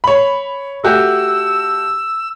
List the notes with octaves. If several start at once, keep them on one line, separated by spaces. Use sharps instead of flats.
C#5 B5
A3 F#4 G4 E6